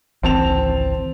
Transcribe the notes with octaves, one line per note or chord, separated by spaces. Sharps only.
G#1 C#2 E3 C4 A5 F7